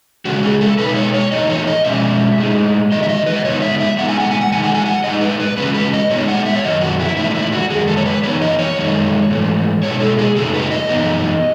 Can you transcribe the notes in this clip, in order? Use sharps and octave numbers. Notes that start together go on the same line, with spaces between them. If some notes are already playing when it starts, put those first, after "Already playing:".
C#3 G#3 C#4 F#4
G#4
A4
B2 G#3 D#4 B4
C#5
C#5
A2 E3 A3 D#4 D#5
C#5
D#5
B2 G#3 C#4 E5
A2 G#3 D#4
D#3 G#3 D#4 D#5
E5
D#5
B4
D#5
C#3 G#3 B3 D#4 C#5
E5
E5
A2 G#3 B3 D#4 F#5
G#5
F#5
G#5
F#5
D#3 G#3 D#4 G#5
F#5
G#5
F#5
A2 G#3 D#4 D#5
B4
B4
E2 C#3 G#3 C#4 B4
B4
D#5
A2 G#3 B3 D#4 C#5
F#5
E5
C#5
F#2 D#3 F#3 D#5
F#4
E4
E2 D#3 A3 D#4 E4
D#4
E4
F#4
F#2 D#3 G#3 G#4
A4
C#5
B4
F#2 E3 B3 D#4 C#5
D#5
C#5
F#2 D#3 G#3 D#4
G#2 E3 A3
B2 G#3 D#4 C#5
A4
G#4
F#2 C#3 F#3 A3 D#4 A4
B4
D#5
F#2 E3 B3 D#4